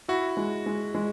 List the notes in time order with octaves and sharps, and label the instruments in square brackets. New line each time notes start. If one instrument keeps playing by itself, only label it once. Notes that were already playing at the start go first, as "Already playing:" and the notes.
[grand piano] E4 [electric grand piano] F#4
[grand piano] G#3
G#3
G#3